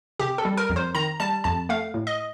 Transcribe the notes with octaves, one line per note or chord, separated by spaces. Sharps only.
C3 G4
A4
G3
A#4
F2
C5
D#3 A#5
G3 A5
F2 A5
A3 F5
A2
D#5